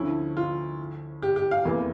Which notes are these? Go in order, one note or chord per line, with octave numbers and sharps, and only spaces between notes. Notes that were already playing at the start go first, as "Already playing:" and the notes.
Already playing: D2 D3 F3 A3 C#4 E4
F4
G4
G4
F5
F1 E2 E3 A#3